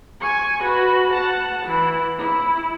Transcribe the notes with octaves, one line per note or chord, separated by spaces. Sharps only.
G#5 C#6
F#4 B4
F#5 A5
E3 E4
E4